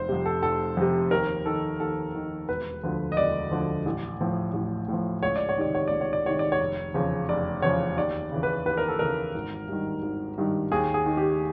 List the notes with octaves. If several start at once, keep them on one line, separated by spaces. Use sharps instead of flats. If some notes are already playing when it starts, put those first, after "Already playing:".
Already playing: F1 C5
F2 C3
A4
F1 A4
F2 C3
D#2 A#4
D#3 A4
D#2 A4
D#3
E1 B4
D2 D3 F3
D#5
E1 D5
D2 D3 F3
A1
A2 F3
A1
A2 F3
C#2 C#5
D5
C#5
C3 D#3 D5
C#5
C#2 D5
C#5
D5
C3 D#3 C#5
D5
C#5
F1
E2 C#3 F3
F1 D5
E2 C#3 F3 C#5
D#2 D5
C#3 E3
B4
D#2 B4
A#4
A4
C#3 E3 A#4
G#1
G2 D#3
G#1
G2 D#3
D#2 G#4
G#4
D#3
G4